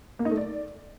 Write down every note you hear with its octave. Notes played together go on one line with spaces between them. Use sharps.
A#3
D#4
A3
D5